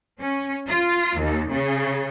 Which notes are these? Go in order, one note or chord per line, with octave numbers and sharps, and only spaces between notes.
C#4
F4
D#2
C#3